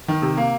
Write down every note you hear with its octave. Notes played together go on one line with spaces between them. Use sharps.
D#3
C3
A#3